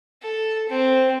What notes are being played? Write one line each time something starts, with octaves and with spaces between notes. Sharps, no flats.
A4
C4